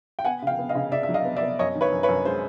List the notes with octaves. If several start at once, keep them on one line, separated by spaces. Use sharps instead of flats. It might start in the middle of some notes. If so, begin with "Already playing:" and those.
G5
B3 F#5 G#5
C#3 F5 G5
B3
D#5 F5
C#3
C#3 D5 E5
E5
F#3
D#5 F5
B3
D5 E5
B3
F#2 C#5 D#5
D#3
B4 C#5
F#2
B4 C#5
F#2
G#3 C5